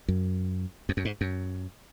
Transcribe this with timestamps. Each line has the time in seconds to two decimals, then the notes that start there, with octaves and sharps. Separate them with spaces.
0.08 F#2
0.89 F2
0.97 F#2
1.05 G#2
1.21 F#2